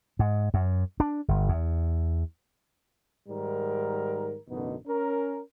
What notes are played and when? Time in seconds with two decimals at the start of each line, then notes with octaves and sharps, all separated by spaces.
0.19 G#2
0.54 F#2
1.00 D4
1.28 G1
1.48 E2
3.29 G#2 D#3 G3 A#4
4.49 A1 F#2 B2 D3 B3 D#4
4.87 C#4 A#4